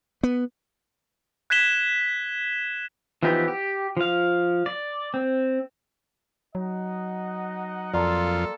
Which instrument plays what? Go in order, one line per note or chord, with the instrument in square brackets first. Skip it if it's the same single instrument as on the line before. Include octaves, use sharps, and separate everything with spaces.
[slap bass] B3
[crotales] F#6 G#6 B6 E7 G7
[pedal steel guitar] E3 F3 B3 D#4 G4
G4
F3 F5
D5
C4
[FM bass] F#3 [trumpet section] D#4 D#5 F#5
[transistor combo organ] F2 F4 [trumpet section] A#3 A4 [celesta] D5 A#5 C6